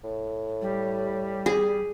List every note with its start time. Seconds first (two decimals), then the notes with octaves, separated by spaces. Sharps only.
0.04 A2
0.62 G3
1.46 G#4